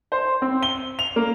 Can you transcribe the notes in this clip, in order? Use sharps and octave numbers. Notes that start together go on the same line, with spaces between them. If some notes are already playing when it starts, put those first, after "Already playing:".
C5
C4
G7
F7
A#3